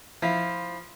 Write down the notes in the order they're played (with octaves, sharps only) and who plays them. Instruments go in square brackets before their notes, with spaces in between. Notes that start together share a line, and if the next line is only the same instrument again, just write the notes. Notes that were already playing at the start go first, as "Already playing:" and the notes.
[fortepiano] F3 [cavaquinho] E4 F4